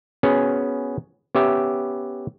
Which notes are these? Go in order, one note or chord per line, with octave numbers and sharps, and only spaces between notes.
B3 C#4 F#4 G#4
B3 C#4 G4 E5